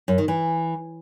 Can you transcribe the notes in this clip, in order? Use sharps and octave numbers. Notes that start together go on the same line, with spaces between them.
F#2
D#3
E3